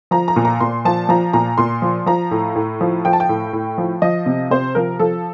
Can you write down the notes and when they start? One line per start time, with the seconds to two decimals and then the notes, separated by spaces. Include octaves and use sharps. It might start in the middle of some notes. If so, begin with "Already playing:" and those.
0.11 F3 A#5
0.28 A#5
0.36 A#2
0.45 A#5
0.60 A#2 C6
0.85 F3 A5
1.09 F3 A#5
1.33 A#2 A#5
1.58 A#2 C6
1.82 F3
2.06 F3 A#5
2.31 A2
2.56 A2
2.81 F3
3.05 F3 G5
3.13 A5
3.20 G5
3.29 A2
3.53 A2
3.78 F3
4.02 F3 D#5
4.26 C3
4.51 C3 C5
4.75 F3 A#4
4.99 F3 A4